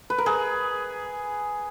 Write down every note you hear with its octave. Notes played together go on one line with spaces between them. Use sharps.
B4
A#4
G#4 B4